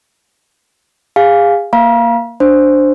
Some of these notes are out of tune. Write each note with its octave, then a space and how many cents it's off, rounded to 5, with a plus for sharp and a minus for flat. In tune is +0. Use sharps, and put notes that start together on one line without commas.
G#4 -30 F5 +0 G#5 +0
A#3 +0 F5 -10 A#5 +40
D4 +0 C5 +0